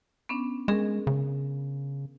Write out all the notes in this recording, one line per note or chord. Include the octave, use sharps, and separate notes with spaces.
B3 C#4 D4
G#3 C#4 G#4 A#4
C#3